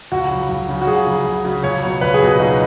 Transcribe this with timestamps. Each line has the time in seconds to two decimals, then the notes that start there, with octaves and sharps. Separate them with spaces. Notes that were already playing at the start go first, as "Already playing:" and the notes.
0.12 C#2 F#4
0.31 C#3 F#3
0.50 C#2
0.69 C#3 F#3
0.82 F#4
0.87 C#2 G#4
1.07 C#3 F#3
1.25 C#2
1.45 C#3 F#3
1.64 C#2 C#5
1.82 B2 C#5
1.86 F#3
2.01 C#2 B4
2.14 G#4
2.21 B2 F#3
2.27 G#4
2.40 C#2 D#4